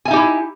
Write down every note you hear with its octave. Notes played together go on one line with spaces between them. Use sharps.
D#4 E4 G4 E5 G#5